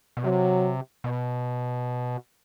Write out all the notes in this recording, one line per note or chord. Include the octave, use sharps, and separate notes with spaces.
B2
C3 F#3
B2